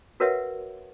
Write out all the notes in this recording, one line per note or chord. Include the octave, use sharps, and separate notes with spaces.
F#4 A#4 B4 C#5 E5 F#5